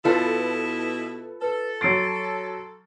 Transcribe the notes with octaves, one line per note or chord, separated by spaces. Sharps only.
B2 E4 F4 A4 B4 A6
A4 B4
F#3 C6 A6 C7 D7